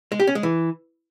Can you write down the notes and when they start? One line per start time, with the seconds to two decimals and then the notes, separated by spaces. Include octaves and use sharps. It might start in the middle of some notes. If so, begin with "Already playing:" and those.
0.12 G#3
0.20 G4
0.27 C#4
0.35 G#3
0.43 E3